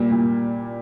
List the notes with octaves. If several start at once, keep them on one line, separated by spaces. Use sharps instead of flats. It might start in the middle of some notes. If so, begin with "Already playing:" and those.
Already playing: A#2 G3 A#3
A#2